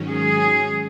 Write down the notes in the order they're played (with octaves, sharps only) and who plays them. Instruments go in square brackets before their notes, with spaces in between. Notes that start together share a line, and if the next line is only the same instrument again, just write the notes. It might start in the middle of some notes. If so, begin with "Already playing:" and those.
Already playing: [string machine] G#2 D#3 F#3 C#4
[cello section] G#4